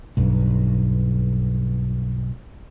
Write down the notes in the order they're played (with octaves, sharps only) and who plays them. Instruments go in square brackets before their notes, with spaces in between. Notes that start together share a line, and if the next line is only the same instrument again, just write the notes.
[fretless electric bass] B1 G2